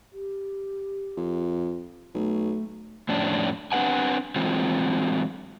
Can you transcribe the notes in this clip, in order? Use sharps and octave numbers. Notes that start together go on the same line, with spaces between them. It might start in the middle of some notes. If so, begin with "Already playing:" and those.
G4
F2
B1 A3
F2 A2 C#4 D4
C4 D4 B4 F#5 G#5
E3 F#3 G#3 C4 F4